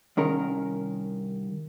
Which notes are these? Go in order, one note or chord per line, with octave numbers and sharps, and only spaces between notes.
C2 D#3 C#4 A#4